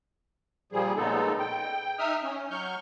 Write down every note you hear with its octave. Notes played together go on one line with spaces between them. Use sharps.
A#2 F3 G3 G#4
A#2 C#3 G#3 B3 D#4 A4
G5
D#4 E5 D#6 F6
C#4
F#3 C#6 F6 G6